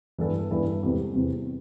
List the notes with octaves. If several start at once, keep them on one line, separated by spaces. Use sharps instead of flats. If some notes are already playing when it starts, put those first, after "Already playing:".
G2 E3 B3 E4 A4
G2 E3 B3 E4 A4
E2 C3 G3 C4
E2 C3 G3 C4